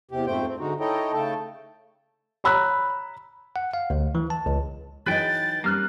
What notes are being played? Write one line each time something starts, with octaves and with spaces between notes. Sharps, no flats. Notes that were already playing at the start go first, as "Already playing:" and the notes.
E2 C3 G4
F2 G#2 A3 C5 G5
C4
D3 G#3 D#4 F#4
D#4 E4 A4 C#5 D#5 G5
C#3 A3 A4 G5 A5
C#5 A#5 B5 E6 F#6
F#5
F5
D2
E3
A5
C#2
E3 F#3 D#4 G#4 B4 D#5 G5 A6
G3 A#3 C#4 F6 F#6